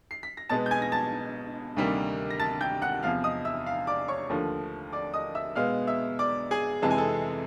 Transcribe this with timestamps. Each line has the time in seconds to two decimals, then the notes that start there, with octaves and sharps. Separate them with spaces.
0.11 C7
0.23 B6
0.37 A#6
0.49 B2 G#3 B3 A5 A6
0.66 G6
0.71 G#5 G#6
0.82 A#6
0.92 A5 A6
1.77 D2 C3 D#3 G3 A#3
2.31 A#6
2.40 A5 A6
2.61 G5 G6
2.82 F#5 F#6
3.03 E2 C3 F3 F5 F6
3.24 D#5 D#6
3.45 E5 E6
3.66 F5 F6
3.87 D5 D6
4.08 C#5 C#6
4.29 D#2 D3 F3 A3
4.93 D5 D6
5.14 D#5 D#6
5.35 E5 E6
5.55 B2 G#3 B3 F5 F6
5.87 E5 E6
6.19 D5 D6
6.51 G#4 G#5
6.82 F2 C3 E3 G#3 A5
6.91 G#5
6.98 A4 A5